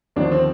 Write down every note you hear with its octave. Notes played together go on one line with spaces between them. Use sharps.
D#2 D3 F3 D4
C4